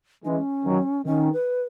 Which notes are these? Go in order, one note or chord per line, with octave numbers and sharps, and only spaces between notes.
E3 G#3 C#4 D#4
D#3 F#3
D#3 C#4
B4